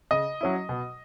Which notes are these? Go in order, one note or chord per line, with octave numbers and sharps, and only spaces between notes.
C#3 D#5
F#3 C#4 E4
B2